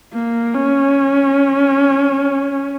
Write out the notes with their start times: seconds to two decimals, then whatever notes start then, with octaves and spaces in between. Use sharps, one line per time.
0.13 A#3
0.54 C#4